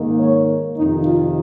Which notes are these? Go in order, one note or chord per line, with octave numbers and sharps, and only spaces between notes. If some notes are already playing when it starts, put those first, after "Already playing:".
Already playing: G#2 D#3 A#3
C#5
F2 C3 D#3 D#4
F4